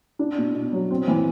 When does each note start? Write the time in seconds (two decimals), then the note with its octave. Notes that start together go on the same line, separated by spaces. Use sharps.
0.19 D4
0.38 B2
0.55 B2
0.73 F#3
0.91 C4
1.08 E3